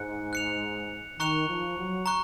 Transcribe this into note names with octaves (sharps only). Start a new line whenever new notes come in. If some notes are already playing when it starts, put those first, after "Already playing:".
Already playing: G#2 F#6 C#7
F#6 C#7 F7
D#3 A#5 C#6 F#6 C#7 F7
F3
F#3
A#5 C#6 F#6